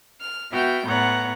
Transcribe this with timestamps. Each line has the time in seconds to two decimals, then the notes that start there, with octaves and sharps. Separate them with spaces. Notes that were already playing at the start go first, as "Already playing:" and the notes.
0.21 F6
0.53 B3 F#4 E5 G5 F6 G6
0.88 A2 B3 C#5 F#5 A#5